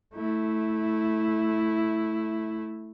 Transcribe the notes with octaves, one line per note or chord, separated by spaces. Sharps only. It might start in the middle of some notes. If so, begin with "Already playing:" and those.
A3 E4